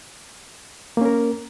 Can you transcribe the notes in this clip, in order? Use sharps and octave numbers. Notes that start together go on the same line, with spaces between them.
A#3 C#4 A#4